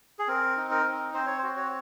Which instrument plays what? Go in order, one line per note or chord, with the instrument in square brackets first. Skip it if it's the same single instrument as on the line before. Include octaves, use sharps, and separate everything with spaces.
[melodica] G#4
C4 A#4
D#4
A#4
C4
C4 C5
C#5
F#4 C5
C#5